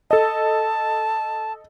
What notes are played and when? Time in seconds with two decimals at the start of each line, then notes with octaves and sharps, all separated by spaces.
0.11 A4 D#5 A5